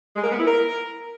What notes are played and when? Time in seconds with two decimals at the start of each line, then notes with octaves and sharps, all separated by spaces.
0.16 G#3
0.24 A#4
0.32 B3
0.39 E4
0.47 A#4